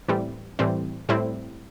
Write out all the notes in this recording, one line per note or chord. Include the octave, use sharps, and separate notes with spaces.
A2 E3 G3 C4
A2 E3 G3 C4
A2 G3 C4 E4